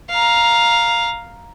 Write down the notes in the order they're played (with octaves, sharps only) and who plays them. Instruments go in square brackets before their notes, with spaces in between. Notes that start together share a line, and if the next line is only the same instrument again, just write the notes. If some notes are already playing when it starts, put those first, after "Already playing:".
[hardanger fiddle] F5 A#5